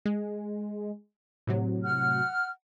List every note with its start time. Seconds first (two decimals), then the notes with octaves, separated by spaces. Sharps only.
0.05 G#3
1.47 A2 C3 F#3
1.84 F#5 F6